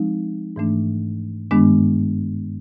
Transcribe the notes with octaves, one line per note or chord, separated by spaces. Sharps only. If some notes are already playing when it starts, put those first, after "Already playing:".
Already playing: F3 G#3 C4 D#4
G#2 E3 A3 D4
G2 D#3 G#3 B3 D4